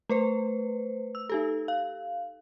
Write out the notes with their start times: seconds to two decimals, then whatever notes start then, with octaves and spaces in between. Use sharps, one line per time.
0.09 A3 B4 C5
1.15 E6
1.30 D#4 G4 A4
1.68 F5